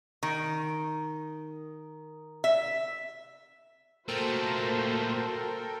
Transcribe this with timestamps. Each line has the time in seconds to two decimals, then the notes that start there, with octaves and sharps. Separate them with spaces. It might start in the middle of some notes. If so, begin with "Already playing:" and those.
0.23 D#3
2.44 E5
4.08 A#2 A3 A#3 F#4 A4 A#4 C5 G5